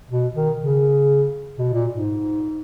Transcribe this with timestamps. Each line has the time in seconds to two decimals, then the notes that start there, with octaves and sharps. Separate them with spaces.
0.10 B2
0.34 D#3
0.59 C#3
1.58 B2
1.73 A#2
1.91 G#2